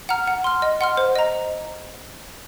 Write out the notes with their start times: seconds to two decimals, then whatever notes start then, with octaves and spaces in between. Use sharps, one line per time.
0.09 F#5 A#5 F6
0.28 F#5
0.44 C6 F6
0.62 D#5
0.81 F#5 C6 F6
0.97 C5
1.15 D#5 A#5